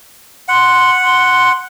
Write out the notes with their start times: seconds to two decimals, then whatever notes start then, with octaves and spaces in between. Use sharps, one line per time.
0.49 F#5 C6
1.03 C6